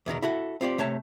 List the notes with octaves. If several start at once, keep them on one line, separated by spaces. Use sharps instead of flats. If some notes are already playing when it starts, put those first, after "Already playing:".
E2 B2 D#3 A#4
E4 F#4 A4 F#5
C4 F4 G4 D5
C3 A3 C#5 A5